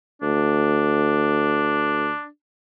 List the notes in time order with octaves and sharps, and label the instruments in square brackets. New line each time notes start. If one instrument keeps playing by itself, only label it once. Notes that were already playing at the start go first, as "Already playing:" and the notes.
[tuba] D2 [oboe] D4